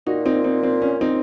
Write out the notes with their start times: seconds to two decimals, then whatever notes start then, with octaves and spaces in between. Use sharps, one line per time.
0.07 A#2 D#4 F#4
0.26 C4 D#4
0.44 C4 D#4
0.63 C4
0.82 C#4
1.01 C4 D#4